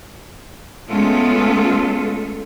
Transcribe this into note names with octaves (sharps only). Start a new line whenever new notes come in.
G#3 A3 B3 C#4 F4 A4